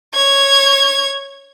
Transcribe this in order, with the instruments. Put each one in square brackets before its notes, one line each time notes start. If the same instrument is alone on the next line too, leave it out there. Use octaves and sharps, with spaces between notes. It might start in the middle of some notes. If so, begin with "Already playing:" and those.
[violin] C#5 G#6